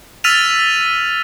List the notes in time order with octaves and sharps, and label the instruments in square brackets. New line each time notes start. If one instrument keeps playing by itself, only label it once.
[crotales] E6 F6 A6 B6 D#7 F7